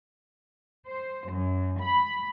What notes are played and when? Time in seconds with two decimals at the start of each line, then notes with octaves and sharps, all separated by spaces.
0.85 C5
1.29 F#2
1.80 B5